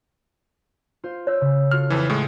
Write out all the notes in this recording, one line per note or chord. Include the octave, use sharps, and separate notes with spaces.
F4 C5
C#5 E6 G6
C#3
F4 F#4 A4 F6
F2 E3
A2 G#3